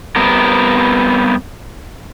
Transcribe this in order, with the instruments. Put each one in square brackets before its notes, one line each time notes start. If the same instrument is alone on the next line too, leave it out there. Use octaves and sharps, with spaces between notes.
[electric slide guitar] G3 B3 C4 A#4